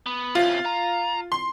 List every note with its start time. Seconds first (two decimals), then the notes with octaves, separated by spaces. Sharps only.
0.06 B3
0.35 C3 C#4 F4
0.65 A#5
1.32 C6